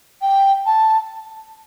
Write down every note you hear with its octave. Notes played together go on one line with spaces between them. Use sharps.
G5
A5